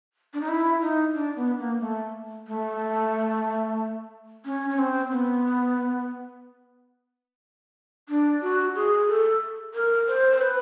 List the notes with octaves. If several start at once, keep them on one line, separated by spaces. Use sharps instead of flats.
D4
D#4
E4
D#4
D4
B3
A#3
A3
A3
C#4
C#4
C4
B3
D4
F#4
G#4
A4
A#4
C5
C5
B4